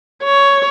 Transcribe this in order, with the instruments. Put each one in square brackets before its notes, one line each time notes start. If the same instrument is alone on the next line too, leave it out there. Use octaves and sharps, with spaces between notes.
[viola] C#5